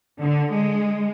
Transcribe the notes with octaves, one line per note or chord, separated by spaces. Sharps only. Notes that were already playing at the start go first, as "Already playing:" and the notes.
D3
G#3